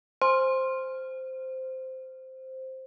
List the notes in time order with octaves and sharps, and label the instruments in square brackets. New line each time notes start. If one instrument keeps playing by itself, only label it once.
[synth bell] C5 [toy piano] G#5 C6